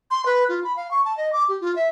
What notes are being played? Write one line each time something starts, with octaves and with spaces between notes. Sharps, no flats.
C6
B4
F4
B5
F5
C#6
A5
D#5
D6
G4
F4
E5